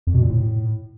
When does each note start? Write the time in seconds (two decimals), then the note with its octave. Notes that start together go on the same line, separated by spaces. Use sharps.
0.07 F2
0.14 B2
0.22 A#2
0.29 A2